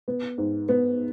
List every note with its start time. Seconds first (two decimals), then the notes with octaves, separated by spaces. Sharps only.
0.08 B3
0.38 G#2
0.69 B3